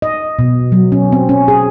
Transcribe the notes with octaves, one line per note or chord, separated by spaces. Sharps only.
D#5
B2
F#3
C#4
C4
C#4
G#4